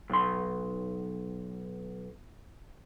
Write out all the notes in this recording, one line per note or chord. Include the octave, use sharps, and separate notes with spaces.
B1 C6